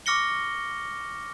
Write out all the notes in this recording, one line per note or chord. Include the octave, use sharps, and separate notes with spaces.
C#6 D6 F6 A#6 C#7 G7